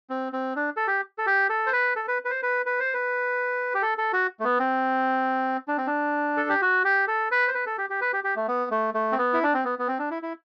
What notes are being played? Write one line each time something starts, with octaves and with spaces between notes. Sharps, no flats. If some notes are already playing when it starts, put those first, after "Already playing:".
C4
C4
D4
A4
G4
A4
G4
A4
C5
B4
A4
B4
B4
C5
B4
B4
C5
B4
G4
A4
A4
F#4
A3
B3
C4
D4
C4
D4
A4
G4
F#4
G4
A4
B4
C5
B4
A4
G4
G4
B4
G4
G4
A3
B3
A3
A3
C4
B3
E4
D4
C4
B3
B3
C4
D4
E4
E4